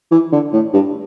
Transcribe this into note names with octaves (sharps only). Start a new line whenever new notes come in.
E3
D3
A2
G2